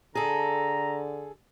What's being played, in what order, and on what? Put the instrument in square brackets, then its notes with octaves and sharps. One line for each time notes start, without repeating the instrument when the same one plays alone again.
[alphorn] D3 [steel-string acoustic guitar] G#4 A4 [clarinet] A#5